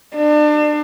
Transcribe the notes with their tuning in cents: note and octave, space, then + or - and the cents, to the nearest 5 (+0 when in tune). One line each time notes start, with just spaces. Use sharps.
D4 +35